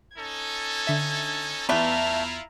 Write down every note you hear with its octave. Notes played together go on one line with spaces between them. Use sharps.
C#4 D#4 A4 G#6
D3 E5
E2 G3 A3 B3 E4 F4 A#5 F6